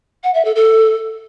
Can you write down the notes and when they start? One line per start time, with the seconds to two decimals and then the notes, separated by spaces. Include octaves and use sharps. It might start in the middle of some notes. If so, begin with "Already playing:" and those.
0.23 F#5
0.34 E5
0.45 A4
0.55 A4